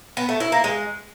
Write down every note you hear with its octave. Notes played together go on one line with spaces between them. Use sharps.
B3
A3
E4
A#3
G#3